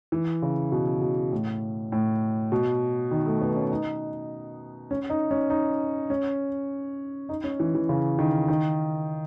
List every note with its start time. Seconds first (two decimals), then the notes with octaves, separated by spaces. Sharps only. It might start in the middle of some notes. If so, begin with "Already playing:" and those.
0.12 E3
0.42 C#3
0.72 B2
1.01 B2
1.32 A2
1.92 A2
2.52 B2
3.11 D#3
3.26 A3
3.42 B3
3.56 C#4
3.71 D#4
4.91 C#4
5.10 D#4
5.31 C#4
5.50 D#4
6.10 C#4
7.29 D#4
7.44 C#4
7.60 E3
7.75 E3
7.89 C#3
8.19 D#3
8.48 D#3